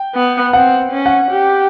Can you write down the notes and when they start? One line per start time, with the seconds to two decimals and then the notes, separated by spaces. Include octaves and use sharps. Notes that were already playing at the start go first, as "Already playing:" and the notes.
Already playing: G5
0.15 B3
0.53 C4 F#5
0.92 C#4
1.06 F#5
1.31 G4